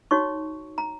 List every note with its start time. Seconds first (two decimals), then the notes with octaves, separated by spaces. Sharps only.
0.11 D#4 F#4 C#5 C#6
0.78 A#5